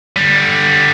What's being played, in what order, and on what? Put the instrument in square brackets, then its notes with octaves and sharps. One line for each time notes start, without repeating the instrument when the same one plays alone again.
[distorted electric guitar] D3 G3